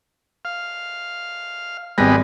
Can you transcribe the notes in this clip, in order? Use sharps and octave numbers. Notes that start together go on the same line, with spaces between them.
F5
G#1 G3 G#3 B3 A#6